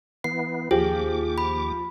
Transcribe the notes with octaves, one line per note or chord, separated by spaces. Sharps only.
E3 B3 C7
D#2 F3 G4 G#4 D6
B5